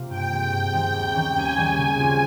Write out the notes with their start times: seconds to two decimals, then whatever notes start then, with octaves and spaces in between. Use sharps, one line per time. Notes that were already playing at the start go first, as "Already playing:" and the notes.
Already playing: C3 G3 A#3 F4
0.09 G2 G5
0.30 D#3 G#3 C4
0.52 G2
0.72 D#3 G#3 C4
0.93 D#2
1.14 D#3 G3 C#4
1.35 D#2 G#5
1.57 D#3 G3 C#4
1.77 C#3 G#5
1.99 G3 C4 F4